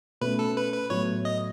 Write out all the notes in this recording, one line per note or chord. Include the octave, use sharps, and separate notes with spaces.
B2 A3 C#4 B4
A4
B4
B4
A2 F#3 B3 F#4 A4 C#5
D#5